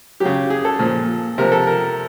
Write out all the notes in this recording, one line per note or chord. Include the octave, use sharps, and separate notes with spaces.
C#3 F#3 G4
G#4
A4
A#2 F3
C3 F3 A#4
A4
A#4